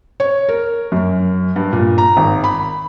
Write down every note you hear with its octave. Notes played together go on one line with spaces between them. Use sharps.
C#5
A#4
F#2
G2
A#2
A#5
G#1
B5